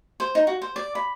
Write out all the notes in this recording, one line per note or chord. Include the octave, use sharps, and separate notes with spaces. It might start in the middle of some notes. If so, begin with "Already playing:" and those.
C5
D#4
F#4
C5
D5
B5